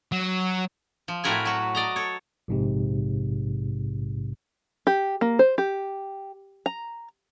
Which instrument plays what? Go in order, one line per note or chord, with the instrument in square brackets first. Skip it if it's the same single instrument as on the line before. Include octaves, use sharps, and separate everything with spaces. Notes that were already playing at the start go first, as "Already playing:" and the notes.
[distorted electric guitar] F#3
[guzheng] F3
A2 C4 F#4 A#4 B4 G#5
F#3 F#4 B4
D5 D#5 A#5
A4 C#5
[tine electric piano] A#1 G#2 C3
[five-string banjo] G4
A#3
C5
G4
A#5